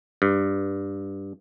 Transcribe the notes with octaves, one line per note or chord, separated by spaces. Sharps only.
G2